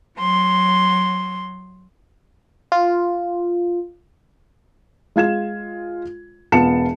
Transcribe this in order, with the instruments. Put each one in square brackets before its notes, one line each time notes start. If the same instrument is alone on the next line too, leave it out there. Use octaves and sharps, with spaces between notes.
[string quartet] F#3 C6
[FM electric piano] F4
[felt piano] G#3 F4 G#6 E7
E1 B3 F4 A5 C#7 E7